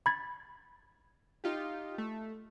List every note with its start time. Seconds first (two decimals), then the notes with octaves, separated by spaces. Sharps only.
0.06 B5 G#6 A6
1.44 D#4 F4 G4
1.98 A3